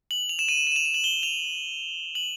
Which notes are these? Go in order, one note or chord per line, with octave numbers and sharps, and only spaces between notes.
F#7
F7
E7
D#7
E7
D#7
E7
F7
E7
F#7
G7
F7
F#7